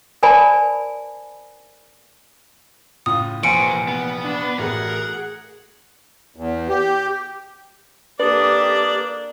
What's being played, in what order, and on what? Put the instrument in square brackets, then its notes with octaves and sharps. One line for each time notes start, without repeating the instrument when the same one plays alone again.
[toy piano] A#4 C5 D5 G#5 A5 B5
[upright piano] A2 C#3 F4 [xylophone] D#6
[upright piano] F1 A#2 E3 [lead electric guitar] A#4 C5 [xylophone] G#5 C#7 D7
[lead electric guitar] B3
[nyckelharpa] D4
[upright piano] A1 A3 F#4 [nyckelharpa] G#4 F#5 [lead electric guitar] A#4
[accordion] E2
G4
[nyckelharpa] A#3 D4 [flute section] G4 A4 D#6 [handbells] B4 [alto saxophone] D5